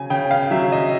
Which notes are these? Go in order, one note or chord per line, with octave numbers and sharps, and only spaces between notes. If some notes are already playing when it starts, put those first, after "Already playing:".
Already playing: C#3 F#3 G#5
C#3 G5
F5
F#3 E5
D#5